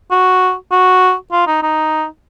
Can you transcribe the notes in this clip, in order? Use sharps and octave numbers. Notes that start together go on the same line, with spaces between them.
F#4
F#4
F4
D#4
D#4